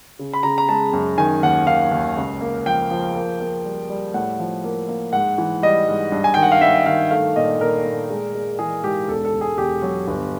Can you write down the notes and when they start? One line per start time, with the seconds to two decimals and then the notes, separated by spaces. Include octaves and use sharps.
0.19 C#3
0.34 B5
0.43 C#3 A#5
0.58 A#5
0.69 G#3 A5
0.93 F#2
1.18 D#3 G#5
1.43 D#2 F#5
1.67 D#3 F5
1.91 D#2
2.17 C#2
2.41 A#3
2.66 F3 G5
2.91 F3
3.15 A#3
3.40 A#3
3.65 G3
3.89 G3
4.14 A2 F#5
4.39 F3
4.64 A#3
4.89 A#3
5.13 G#2 F#5
5.38 E3
5.63 G3 D#5
5.88 G#2
6.12 G2
6.24 G#5
6.34 D#3 G5
6.43 F#5
6.52 F5
6.61 G2 E5
6.86 D#3 F5
7.11 A3 F5
7.36 A#2 D#5
7.61 A#2 A#4
7.84 A#2
8.10 G#3
8.35 G#3
8.59 E3 G#4
8.83 G#2 G4
9.08 E1 A4
9.25 A4
9.33 E1
9.41 G#4
9.58 E1 G4
9.82 F#3
10.08 G1